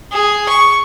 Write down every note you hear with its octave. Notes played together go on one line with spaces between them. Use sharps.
G#4
C#6